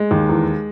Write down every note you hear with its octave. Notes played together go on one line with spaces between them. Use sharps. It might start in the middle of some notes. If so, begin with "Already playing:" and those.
Already playing: G#3
D#2
E2